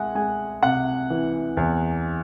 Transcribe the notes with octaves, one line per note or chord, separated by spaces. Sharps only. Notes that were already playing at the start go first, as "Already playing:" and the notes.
Already playing: G#3 E5 F#5 G#5
G#3 G#5
C3 F#5
E3
E2